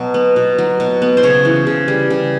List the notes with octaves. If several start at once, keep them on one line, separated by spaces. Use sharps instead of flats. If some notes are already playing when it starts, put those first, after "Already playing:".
Already playing: B2 F#3
B3
B2
F#3
B2
B3
C5
C#3 C#5
E3
C#3
G3
C#3